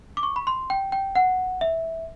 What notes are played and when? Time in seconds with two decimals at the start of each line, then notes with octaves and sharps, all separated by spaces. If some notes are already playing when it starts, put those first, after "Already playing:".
0.17 D6
0.23 C#6
0.36 B5
0.47 C6
0.70 G5
0.92 G5
1.16 F#5
1.61 E5